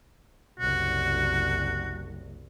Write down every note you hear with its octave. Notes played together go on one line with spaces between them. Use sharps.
F#1 C2 F#4